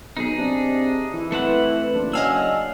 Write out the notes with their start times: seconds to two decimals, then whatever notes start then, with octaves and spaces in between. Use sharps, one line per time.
0.17 B1 D#4 G#4
0.38 C3 D4
1.14 E3 E4
1.32 A3 C4 B4 F#5
1.93 F#1 D4
2.13 F#3 D4 D#5 F5 G#5 E6